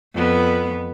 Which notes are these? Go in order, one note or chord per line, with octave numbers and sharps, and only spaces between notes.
F2 B3